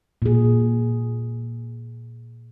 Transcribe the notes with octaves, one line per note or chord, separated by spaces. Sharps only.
A#2 G#4